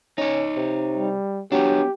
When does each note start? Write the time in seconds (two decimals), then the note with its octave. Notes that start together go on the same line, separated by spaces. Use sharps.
0.18 C#4 D#4 C#5
0.57 C3
0.97 G3
1.52 F#3 B3 D4 G4